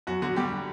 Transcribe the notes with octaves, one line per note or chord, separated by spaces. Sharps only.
F#2 F#4
D3 F#4
G3 G4